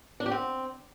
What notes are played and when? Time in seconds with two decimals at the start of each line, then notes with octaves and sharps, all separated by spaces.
0.20 D4
0.26 G4
0.31 C4